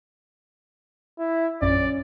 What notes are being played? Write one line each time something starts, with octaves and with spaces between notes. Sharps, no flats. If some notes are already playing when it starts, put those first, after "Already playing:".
E4
A#1 F#2 C#4 D5